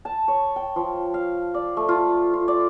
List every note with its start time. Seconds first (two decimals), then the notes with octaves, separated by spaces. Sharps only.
0.05 A5
0.28 C#5
0.56 G5
0.76 F3
1.14 F5
1.54 D5
1.77 A3
1.89 F4
2.33 F4
2.48 D5